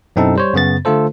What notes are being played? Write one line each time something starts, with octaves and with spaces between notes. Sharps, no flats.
F#2 B2 C4 D#4 E4 A4
G3 C5 C#5
F#2 C#3 B3 A6
D3 A3 F4 A4 C5